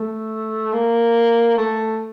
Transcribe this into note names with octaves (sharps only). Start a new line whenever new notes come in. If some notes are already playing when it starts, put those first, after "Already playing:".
Already playing: A3
A#3
A3